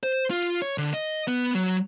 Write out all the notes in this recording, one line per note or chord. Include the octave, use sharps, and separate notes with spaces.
C5
F4
C#5
D3
D#5
B3
F#3